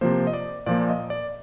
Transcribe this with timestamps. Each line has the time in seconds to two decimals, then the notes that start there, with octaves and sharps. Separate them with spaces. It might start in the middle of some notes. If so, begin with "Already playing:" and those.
0.01 C3 F3 A#3 C5
0.27 D#5
0.33 D5
0.66 A#2 F3 A#3 D5
0.89 D#5
1.10 D5